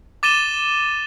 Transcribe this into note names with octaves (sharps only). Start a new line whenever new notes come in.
D6 A6 D#7 E7 G7